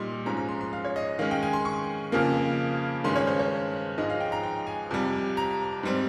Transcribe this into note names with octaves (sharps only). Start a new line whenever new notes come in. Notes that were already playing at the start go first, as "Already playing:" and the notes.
Already playing: A#2 G3 D#4 C6
G#2 F3 G#3 C#4 A#5
A#5
C6
C6
F5
C#5
D#5
D#3 G#3 C#4 F5
G5
G#5
C6
C#6
F2 C#3 F3 A#3
G2 D#3 G#3 C#4 C6
C#5
C5
C#5
G#2 F3 G#3 D#4 D#5
F5
G5
A#5
G5
G#5
F2 C3 G3
A#5
G#2 G3 C4